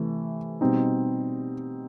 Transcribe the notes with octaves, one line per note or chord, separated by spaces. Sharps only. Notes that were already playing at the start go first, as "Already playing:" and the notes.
Already playing: C3 E3 A3
B2 G3 C4 D#4